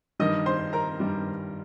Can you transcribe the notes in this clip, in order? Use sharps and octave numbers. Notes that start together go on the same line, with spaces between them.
G2 D#3 G3 D#5 D#6
C5 C6
A#4 A#5
G2 D#3 G3